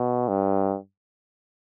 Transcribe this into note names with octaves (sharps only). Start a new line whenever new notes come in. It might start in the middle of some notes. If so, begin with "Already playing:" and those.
Already playing: B2
G2